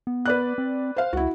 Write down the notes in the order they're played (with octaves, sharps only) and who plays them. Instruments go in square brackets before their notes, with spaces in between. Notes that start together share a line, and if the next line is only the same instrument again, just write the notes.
[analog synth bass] B3
[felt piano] B4 D5 F#6
[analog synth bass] C4
[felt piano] C5 F5
[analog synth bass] C#2 [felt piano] E4 F#4